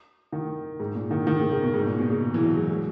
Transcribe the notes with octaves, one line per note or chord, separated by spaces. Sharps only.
D#3
G#2
A#2
D#3
D#3
C#3
C#3
B2
G#2
A#2
B2
C#3
E3
F#3
G#3
G#3